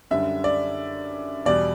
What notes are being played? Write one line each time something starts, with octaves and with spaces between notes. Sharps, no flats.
F#2 D3 G3 E5
D5
E2 B2 G3 D5